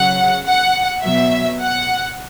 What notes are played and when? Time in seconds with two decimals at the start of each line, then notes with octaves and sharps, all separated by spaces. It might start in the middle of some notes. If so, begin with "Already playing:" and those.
Already playing: C#3 F#3 F#5
0.47 F#5
1.04 B2 F#3 E5
1.61 F#5